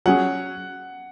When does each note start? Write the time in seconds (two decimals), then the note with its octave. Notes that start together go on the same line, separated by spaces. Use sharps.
0.06 F#3 C#4 G#4 F#5